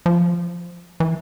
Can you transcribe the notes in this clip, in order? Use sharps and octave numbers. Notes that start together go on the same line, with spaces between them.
F3
E3